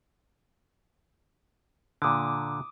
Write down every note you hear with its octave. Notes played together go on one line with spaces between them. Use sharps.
A#2 D3 D6 D#6